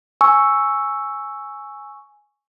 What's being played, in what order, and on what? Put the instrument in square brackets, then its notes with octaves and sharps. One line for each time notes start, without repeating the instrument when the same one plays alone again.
[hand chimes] G#5 C#6 E6